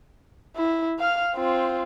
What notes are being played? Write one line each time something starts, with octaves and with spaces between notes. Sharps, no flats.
E4
F5 F6
C4 F4